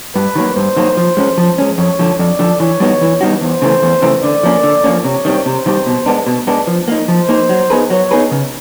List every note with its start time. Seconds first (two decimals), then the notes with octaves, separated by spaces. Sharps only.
0.15 G2 B4
0.36 D#3 F#3 A#3
0.56 G2 C5
0.77 D#3 F#3 A#3
0.97 F3
1.17 G#3 C#4
1.38 F3
1.58 G#3 C#4
1.78 F2 C#5
1.99 D3 F3
2.19 F2 D5
2.39 D3 F3
2.60 E3 C#5
2.80 G3 B3 D#4 F#4
3.01 E3
3.21 G3 B3 D#4 F#4
3.41 E2 C5
3.62 C#3 E3 A3 C4
3.82 E2
4.02 C#3 E3 A3 C4
4.23 D3 D5
4.43 F3 A#3 C#4
4.63 D3
4.84 F3 A#3 C#4
5.04 C3 C#5
5.25 D#3 G3 C4
5.46 C3 C5
5.66 D#3 G3 C4
5.86 B2
6.06 G#3 B3 D4
6.27 B2
6.47 G#3 B3 D4
6.67 F3
6.88 A#3 D#4
7.08 F3 C5
7.29 A#3 D#4
7.49 F#3
7.70 B3 D#4 G#4 B4
7.90 F#3 C#5
8.11 B3 D#4 G#4 B4
8.31 C#3